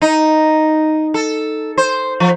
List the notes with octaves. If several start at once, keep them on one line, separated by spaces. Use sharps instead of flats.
D#4
A4
C5
F3